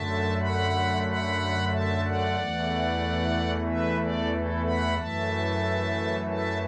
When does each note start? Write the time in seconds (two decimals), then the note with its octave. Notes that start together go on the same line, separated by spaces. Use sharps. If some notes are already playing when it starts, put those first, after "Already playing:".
Already playing: F#2 D3 A3 E5 A5
0.40 F#5 B5
1.05 F#5 B5
1.71 E5 A5
2.04 D5 F#5
2.36 E2 E3 A3
3.66 B4 E5
3.99 A4 D5
4.32 E4 A4
4.65 F#5 B5
4.97 F#2 E3 A3 E5 A5
6.28 E5 A5